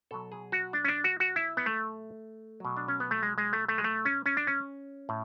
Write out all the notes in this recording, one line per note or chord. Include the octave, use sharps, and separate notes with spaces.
B2 F#3 A4
G#4
F#4
D4
C#4
D4
F#4
F#4
E4
B3
A3
B2 F#3
D4
C#4
B3
A3
G#3
G#3
A3
A3
G#3
A3
C#4
C#4
D4
C#4
A2